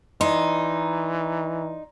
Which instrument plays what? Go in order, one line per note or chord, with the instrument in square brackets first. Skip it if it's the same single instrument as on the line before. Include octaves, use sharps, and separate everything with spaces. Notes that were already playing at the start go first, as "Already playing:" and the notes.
[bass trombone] E3 [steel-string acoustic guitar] D#4 [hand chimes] D5 A#5 C6